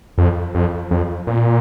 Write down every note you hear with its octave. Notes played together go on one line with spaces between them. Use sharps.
F2
F2
F2
A#2